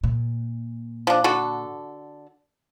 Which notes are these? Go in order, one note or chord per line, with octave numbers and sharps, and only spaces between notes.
A#2
F3 D4
D3 F#4 A4